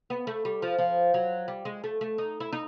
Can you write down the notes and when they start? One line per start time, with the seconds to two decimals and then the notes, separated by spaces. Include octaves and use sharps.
0.10 B3
0.27 A3
0.45 G3
0.62 F3
0.78 F3
1.14 F#3
1.48 G3
1.65 G#3
1.84 A3
2.01 A3
2.18 D#4
2.40 E4
2.53 D#4